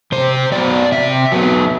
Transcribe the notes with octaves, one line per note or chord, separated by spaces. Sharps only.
C3 C5
F#3 B3 D5
C3 E5
F#3 B3